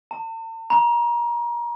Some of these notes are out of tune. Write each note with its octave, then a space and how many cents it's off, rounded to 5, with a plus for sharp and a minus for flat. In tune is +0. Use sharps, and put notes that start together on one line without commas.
A5 +45
A#5 +30